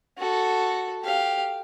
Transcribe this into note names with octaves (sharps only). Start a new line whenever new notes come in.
F#4 A4
G4 F5